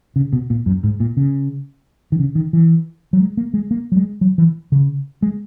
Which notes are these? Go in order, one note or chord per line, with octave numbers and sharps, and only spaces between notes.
C#3
B2
A#2
F#2
G#2
A#2
C#3
D#3
C#3
D#3
E3
F#3
G#3
A#3
G#3
A#3
F#3
G#3
F#3
E3
C#3
G#3